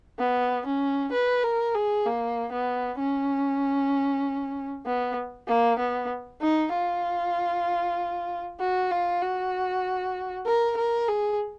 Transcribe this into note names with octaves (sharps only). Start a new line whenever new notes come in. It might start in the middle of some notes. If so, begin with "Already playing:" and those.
B3
C#4
B4
A#4
G#4
A#3
B3
C#4
B3
A#3
B3
D#4
F4
F#4
F4
F#4
A#4
A#4
G#4